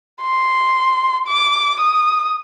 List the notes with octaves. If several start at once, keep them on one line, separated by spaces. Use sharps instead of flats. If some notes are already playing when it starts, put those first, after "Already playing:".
C6
D6
D#6